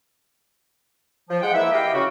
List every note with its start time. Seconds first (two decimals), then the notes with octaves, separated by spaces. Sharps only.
1.29 F3
1.42 G#3 F#5 G5
1.54 E3 A#3 E4 E5
1.72 E4 G4 D#5 F5 G5
1.93 C#3 F#4